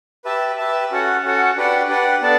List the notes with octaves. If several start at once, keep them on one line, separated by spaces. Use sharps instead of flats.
G4 B4 E5 A5
G4 B4 E5 A5
C#4 F#4 A4 C#5 F#5
C#4 F#4 A4 C#5 F#5
D4 G4 B4 D5 F#5
D4 G4 B4 D5 F#5
B3 D4 A4 D5 A5